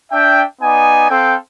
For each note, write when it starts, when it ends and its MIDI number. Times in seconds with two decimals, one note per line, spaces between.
0.12 0.43 62
0.12 0.43 76
0.12 0.43 79
0.61 1.06 59
0.61 1.06 63
0.61 1.06 74
0.61 1.06 80
1.10 1.35 60
1.10 1.35 69
1.10 1.35 77
1.10 1.35 79